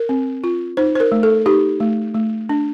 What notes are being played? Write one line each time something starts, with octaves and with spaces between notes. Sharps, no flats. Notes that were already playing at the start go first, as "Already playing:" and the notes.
Already playing: A#4
C4
F4
D#4 C5
C5
A#4
A3
A4
D#4 G4
A3
A3
D4